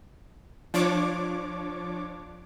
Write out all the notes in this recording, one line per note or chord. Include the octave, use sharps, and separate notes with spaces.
F3 D4 C#5 D6